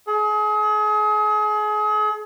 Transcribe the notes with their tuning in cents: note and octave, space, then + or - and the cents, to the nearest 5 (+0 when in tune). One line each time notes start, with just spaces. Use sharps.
G#4 +35